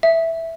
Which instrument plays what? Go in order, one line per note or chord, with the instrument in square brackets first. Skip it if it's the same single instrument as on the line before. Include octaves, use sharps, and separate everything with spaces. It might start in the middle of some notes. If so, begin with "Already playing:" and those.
[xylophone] E5